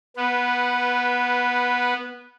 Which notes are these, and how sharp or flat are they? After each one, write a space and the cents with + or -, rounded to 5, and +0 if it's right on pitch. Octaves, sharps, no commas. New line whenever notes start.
B3 -15 B4 +0